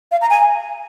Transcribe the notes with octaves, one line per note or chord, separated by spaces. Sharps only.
F5
A#5
G#5